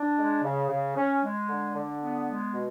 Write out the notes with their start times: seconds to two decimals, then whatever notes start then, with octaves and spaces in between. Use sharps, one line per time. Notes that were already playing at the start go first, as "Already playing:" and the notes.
Already playing: D4
0.17 G#3
0.43 C#3
0.69 C#3
0.96 C#4
1.22 G#3
1.48 D3
1.74 D3
2.00 B3
2.27 G#3
2.53 B2